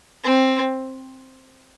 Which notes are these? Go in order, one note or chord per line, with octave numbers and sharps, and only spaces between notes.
C4